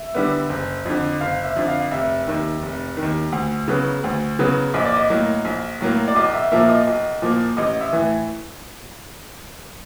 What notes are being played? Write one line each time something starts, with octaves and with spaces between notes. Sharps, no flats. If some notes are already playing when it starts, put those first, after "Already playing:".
Already playing: E5
D3 G3 B3
F#1
F2 D3
F#1 F5
E5
F2 D3
F5
F1 E5
D#2 D#3
F1
D#3
D#2
D2
C#3 F#3 B3
D2
C#3 F#3 B3
A#1 D#5
D5
D#5
A2 F#3 A#3
A#1
A2 F#3 A#3
D5
B1 D#5
E5
A#2 F3 A#3 E5
D#5
B1
A#2 F3 A#3
A1 D#5
E5
A2 E3